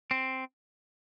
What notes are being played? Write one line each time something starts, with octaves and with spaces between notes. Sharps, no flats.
C4